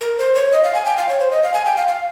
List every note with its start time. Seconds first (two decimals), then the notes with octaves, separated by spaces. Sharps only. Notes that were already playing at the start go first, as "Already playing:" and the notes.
0.01 A#4
0.18 C5
0.35 C#5
0.52 D#5
0.63 F5
0.75 G#5
0.86 G5
0.97 F5
1.09 C#5
1.20 C5
1.31 D#5
1.43 F5
1.54 G#5
1.65 G5
1.77 F5
1.88 F5